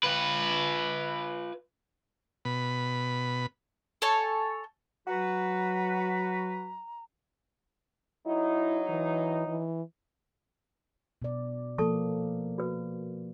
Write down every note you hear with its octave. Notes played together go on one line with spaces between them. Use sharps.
F4 B4
B2 B5
A4 C#5 G#5 A5
F#3 F#4 B4 A#5
F#3 D#4 E4
E3
E3
B2 D5
F3 A#3 A4 A5 C#6
F#4 B4